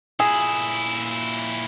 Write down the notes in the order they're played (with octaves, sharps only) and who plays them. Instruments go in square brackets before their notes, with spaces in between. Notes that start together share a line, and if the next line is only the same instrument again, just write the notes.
[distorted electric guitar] A#2 E4 [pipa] G#4